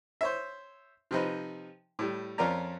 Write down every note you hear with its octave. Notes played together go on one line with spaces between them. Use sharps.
C5 C#5 E5
C3 F3 D#4 B4
A2 G3
F2 C#4 F4 A#4 D5 A#5